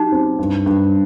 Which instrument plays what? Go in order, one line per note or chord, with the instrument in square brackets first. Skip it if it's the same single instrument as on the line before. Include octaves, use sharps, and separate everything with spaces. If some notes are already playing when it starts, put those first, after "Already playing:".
Already playing: [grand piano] F#3 G4 [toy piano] D#4
[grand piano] C4
G2
G2